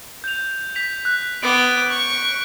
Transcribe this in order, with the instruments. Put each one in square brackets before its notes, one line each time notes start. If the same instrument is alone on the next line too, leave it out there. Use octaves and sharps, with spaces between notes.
[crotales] G6 F7
G6 B6 F7
F#6
[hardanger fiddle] B3 D6 [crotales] D7
[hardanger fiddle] C#6